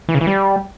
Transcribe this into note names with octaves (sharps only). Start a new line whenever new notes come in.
E3
C#3
E3
G3